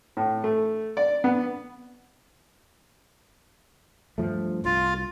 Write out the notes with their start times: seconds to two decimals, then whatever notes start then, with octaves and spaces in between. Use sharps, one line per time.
0.17 A2
0.44 A3
0.97 D5
1.24 B3
4.18 G2 F3 A3
4.65 C2 F4